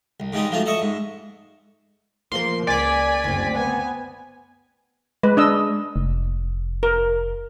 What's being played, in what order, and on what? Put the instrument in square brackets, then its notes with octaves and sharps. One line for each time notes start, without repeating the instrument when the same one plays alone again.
[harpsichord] C2
G#2 C#3 G3 G#3 D#4
G#2 F3 F#3 A3 F4
A4 D#5 E5 C#6
G#2
[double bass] F3 [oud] A#3 A#4 [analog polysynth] C6
[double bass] C#2 [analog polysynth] D5 B6 [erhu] G#5
[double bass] F#1 [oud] D2 C4
[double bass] B3 [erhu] G#5
[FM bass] G#3 [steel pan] B4
[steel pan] D4 D#5 E6
[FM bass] F1
[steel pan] A#4